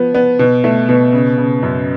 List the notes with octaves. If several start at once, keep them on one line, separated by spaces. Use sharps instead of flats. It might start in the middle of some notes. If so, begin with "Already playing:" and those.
Already playing: F3 B3
B3
B2
A3
B2
C#3
C#3
F#2